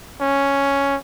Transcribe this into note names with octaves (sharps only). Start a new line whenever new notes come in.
C#4